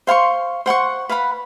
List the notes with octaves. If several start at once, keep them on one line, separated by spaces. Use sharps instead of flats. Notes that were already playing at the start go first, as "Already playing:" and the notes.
C5 F5 C6 C#6
C5 F#5 C6 C#6
B4 F5 F#5 B5